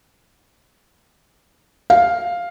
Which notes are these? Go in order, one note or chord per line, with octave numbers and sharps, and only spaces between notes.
F5